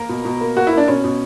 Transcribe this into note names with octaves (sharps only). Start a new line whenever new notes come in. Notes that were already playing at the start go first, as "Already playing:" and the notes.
Already playing: A#3 A#4
B2
B2
A#3
A#3 F#4
E4
A#3 D4
B2 C#4
B2